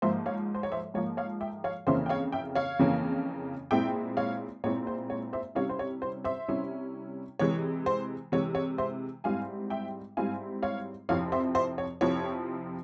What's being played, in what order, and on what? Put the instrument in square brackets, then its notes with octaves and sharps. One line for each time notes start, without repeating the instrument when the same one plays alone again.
[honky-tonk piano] G#2 F3 A#3 C5 E5
C#5 F5
C5
C#5
C5 E5
G#2 F3 A#3 C#5
C#5 F5
E5 G5
C#5 F5
F2 C#3 E3 A#3 C#4 C5 E5
G5
C#5 F5
E5 G5
C#5 F5
F2 C#3 E3 A#3 C#4
A#2 G#3 C4 E4 E5 G5
C#5 F5
A#2 G#3 C4 E4 C#5
C5
C#5
C5 E5
C3 G3 C#4 E4 C#5 F5
C5
C#5
C5
C5 E5
C3 G3 C#4 E4
C3 E3 G#3 C#5
C5
C3 E3 G#3 C#5
C#5
C5 E5
G#2 G3 C4 E4 F5 G#5
E5 G5
G#2 G3 C4 E4 F5 G#5
C#5 F5
F2 C3 F3 C4 E4 C#5 F5
C5 E5
C5 E5
C#5
F2 C3 F3 C4 E4 C#5